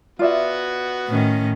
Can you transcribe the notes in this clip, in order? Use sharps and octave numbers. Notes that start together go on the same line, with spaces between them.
B3 F4 F#4 D5 E5
A2 D#3 C#4